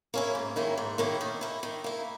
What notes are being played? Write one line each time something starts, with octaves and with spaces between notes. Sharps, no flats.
A#3 C#4 E4
G#2
D#3 A#3 C#4 E4
G#2
D#3 A#3 C#4 E4
D#3
A#3 E4
D#3
A#3 E4